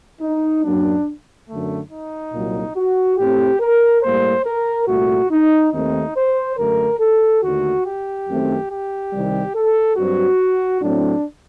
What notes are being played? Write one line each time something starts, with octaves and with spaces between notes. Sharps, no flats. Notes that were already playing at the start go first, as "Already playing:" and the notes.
D#4
F#2 F#3 A#3 D4
F#2 D3 A3
D#4
C2 A#2 F#3 A#3
F#4
A2 A3 C4 G4
A#4
A2 G3 A#3 C5
A#4
C2 A#2 A3 F#4
D#4
D#2 D#3 A3 C4 D#4
C5
F#2 D3 A3 A#4
A4
D#2 D3 A3 F#4
G4
F#2 D#3 A3 C4
G4
C2 C3 D#3 G3
A4
G2 F#3 C4 F#4
A2 F#3 C4 D4